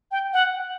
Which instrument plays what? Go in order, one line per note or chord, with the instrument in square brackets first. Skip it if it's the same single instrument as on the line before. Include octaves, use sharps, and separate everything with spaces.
[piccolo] G5
F#5